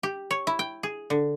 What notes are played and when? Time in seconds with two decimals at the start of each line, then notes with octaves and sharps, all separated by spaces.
0.03 G4
0.31 C#5
0.47 E4
0.59 G5
0.83 G#4
1.10 D3